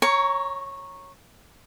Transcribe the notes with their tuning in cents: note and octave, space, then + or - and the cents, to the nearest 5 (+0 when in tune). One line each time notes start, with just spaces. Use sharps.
C#5 -10 A#5 +0 C#6 +20